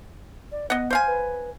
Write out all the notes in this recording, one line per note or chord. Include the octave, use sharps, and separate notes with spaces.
D5
B3 D#5 F#5
C5 F5 G#5
B4